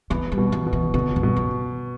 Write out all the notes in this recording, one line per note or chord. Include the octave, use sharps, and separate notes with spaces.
E3 B3
G3
B2
E3
B2
E3
B2 D3
G2
B2
F#2